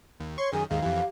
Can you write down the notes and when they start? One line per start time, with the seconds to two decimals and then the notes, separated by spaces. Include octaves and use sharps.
0.20 D#2
0.38 C#5 C6 C#6
0.53 F#2 D#3 G#4 G#5
0.70 D#2 G#2 D#3 G#4 F5
0.82 F2 E3 G4